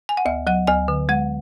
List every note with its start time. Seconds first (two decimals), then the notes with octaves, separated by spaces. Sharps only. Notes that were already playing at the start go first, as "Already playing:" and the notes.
0.09 G#5
0.17 F#5
0.26 D2 E5
0.47 F#3 F#5
0.67 D2 G#5
0.88 D3
1.09 G#3 F#5